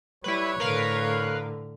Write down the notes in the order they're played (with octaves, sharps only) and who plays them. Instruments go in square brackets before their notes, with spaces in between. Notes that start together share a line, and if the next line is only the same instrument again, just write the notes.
[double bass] G3 [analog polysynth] E4 B4 [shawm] C#5
[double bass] A2 D3 [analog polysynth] A#4 B4 F5